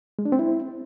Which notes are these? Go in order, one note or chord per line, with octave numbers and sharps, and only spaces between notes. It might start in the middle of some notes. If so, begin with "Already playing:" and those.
G#3
D4
C4
E4